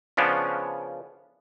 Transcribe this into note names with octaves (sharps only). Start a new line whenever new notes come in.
C#3 F3 B3 C#4 D4